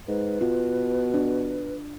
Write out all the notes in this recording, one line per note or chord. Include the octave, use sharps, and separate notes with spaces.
G#2 B4
B2 F4
D4